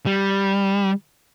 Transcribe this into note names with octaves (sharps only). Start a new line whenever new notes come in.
G3